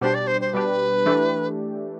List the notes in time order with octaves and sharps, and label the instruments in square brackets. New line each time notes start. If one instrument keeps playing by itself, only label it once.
[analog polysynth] B2 G3 D4 G4 [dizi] C5
[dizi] D5
C5
C5
[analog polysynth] B2 G3 D4 G4 [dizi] B4
[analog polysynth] E3 A3 D4 G4